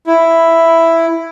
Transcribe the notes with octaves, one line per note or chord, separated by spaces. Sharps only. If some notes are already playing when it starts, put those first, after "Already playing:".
E4